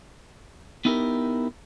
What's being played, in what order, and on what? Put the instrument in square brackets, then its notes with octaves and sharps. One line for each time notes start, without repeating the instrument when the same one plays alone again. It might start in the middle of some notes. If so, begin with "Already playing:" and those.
[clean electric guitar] B3 D#4 E4 G4 G#4 A#4